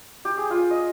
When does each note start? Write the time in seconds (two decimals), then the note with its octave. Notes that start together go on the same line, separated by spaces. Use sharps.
0.25 G4
0.37 G#4
0.50 F4
0.71 D#5